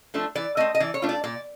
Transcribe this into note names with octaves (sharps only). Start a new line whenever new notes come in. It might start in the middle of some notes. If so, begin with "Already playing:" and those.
F3 A3 D4
E3 D5
A3 C4 D#5
D#5
E3 D5
C#5
A3 D4 F4
D5
A#2 D5